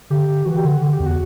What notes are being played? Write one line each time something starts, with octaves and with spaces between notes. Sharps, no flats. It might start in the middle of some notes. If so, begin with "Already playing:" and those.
D3 G4
E3 F#4
G4
D3 F#4
D3 G4
G4
E2
F#4